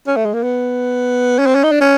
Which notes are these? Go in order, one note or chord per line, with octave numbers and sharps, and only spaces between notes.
C#4
A3
G#3
A#3
B3
C#4
C4
C#4
D#4
D4
C#4